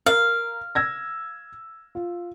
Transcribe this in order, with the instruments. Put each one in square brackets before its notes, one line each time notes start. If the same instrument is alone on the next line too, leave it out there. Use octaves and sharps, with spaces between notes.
[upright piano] A#4 [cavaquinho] F5
[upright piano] E6 G#6 A#6
F4